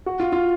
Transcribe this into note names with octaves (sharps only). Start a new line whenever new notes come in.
F#4
F4
F4